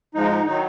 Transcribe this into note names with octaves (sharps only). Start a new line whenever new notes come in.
G#2 F3 G#3 D#4
D#3 F#3 D#4